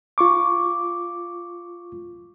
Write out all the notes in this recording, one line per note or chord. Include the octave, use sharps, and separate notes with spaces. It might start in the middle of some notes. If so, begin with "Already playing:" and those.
F4 C#6 D6